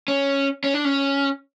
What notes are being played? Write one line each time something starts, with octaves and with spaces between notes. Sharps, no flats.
C#4
C#4
D4
C#4